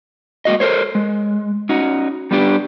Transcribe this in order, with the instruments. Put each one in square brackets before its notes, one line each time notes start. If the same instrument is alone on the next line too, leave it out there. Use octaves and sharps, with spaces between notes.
[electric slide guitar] G#3 A#3 F#4 D#5
A4 A#4 C5 C#5
G#3
C#4 D#4 F#4
G3 B3 D4 G4